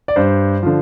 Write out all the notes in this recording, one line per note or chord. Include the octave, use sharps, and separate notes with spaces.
D5
G2 C5
D3 F3